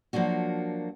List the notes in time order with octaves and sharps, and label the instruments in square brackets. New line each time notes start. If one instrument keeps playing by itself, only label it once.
[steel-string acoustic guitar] F3 F#3 A#3 D4 F#4